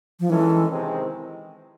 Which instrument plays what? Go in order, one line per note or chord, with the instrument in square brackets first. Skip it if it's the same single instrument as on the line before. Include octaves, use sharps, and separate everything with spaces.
[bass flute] F3
[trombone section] D#3 G#3 C#4 E4 A4 [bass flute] E3
[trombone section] C3 D#3 G#3 C4